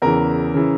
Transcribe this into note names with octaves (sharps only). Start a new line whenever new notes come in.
E2 C#3 E3 A#4
C#3 E3